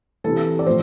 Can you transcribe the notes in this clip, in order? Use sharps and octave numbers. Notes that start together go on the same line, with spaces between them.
C3 E3 A4
D5
A2 F3 C5